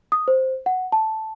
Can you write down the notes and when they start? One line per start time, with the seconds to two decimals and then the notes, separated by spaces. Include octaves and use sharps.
0.12 D#6
0.28 C5
0.66 F#5
0.92 A5